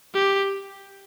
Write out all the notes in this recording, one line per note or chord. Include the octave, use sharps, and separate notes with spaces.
G4